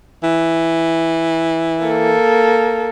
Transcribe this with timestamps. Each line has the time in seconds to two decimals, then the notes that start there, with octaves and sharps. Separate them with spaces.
0.23 E3
1.83 A#3 A4